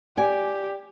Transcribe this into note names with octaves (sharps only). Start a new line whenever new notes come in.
G4 D5 G#5